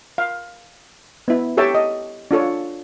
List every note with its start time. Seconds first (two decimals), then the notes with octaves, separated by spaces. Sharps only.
0.18 F5
1.28 B3 E4
1.57 G4 A4 C#5 E5 G5 A5
1.75 D#5
2.31 D4 F4 A4 C#5